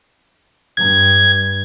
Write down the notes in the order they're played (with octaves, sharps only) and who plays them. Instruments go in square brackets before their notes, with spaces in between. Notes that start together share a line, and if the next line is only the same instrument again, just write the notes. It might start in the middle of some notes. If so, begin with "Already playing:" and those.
[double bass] G2 [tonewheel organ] G#6